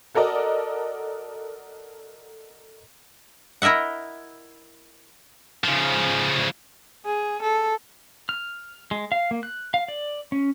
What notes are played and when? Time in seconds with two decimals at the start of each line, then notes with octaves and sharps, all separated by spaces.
0.15 F#4 A4 A#4 D5 D#5
3.62 E4 A#4 D#5 E5 F#5
5.64 C#3 F3
7.05 G#4
7.42 A4
8.29 F6
8.91 G#3
9.12 F5
9.31 A#3
9.43 F#6
9.74 F5
9.88 D5
10.32 C#4